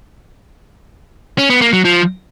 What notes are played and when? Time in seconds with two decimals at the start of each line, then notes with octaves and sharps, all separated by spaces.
1.38 C#4
1.50 B3
1.61 A#3
1.73 F#3
1.85 F3